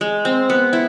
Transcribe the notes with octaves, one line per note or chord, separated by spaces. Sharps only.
G#3
C4
B3
E4